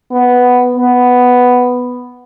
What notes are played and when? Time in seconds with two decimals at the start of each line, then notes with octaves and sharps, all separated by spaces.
0.11 B3
0.77 B3